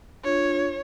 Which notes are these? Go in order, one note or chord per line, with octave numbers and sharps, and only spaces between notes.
D4 F4 C#5